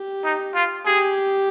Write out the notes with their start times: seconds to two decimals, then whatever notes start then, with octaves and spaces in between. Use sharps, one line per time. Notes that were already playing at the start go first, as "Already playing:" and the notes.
Already playing: G4
0.24 D#4
0.55 F4
0.86 G4 G#4